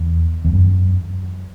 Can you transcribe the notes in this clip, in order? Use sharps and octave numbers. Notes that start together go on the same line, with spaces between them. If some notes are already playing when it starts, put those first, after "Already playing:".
Already playing: E2
E2
F#2